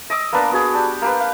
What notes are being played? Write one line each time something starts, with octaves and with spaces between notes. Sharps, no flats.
D#5 D6 E6
A#3 B3 D4 B4
B3 F#4 G#4
D4 G4
A#3 G4 B4
F5